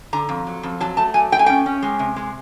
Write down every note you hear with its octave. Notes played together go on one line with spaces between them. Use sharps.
D3 A#5
F2
F#3
F2
F#3 A5
A3 A5
F#3 G#5
A3 G5
G#5
C#4 G5
C#4
G#3
C3
G#3